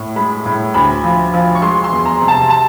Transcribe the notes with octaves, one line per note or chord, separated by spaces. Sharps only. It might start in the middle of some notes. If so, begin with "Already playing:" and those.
Already playing: A2
G#3 B5
A2
D2 B5
F3
F3
C#6
G#3 C6
C6
E2
A#5
C3
A5
A5